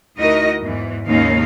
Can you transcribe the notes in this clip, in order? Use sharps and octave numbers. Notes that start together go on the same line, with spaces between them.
D2 D#4 E4 F#4 A#4 D#5
E2 G#2 E3
D#2 G#2 C#3 C#4 D#4 F5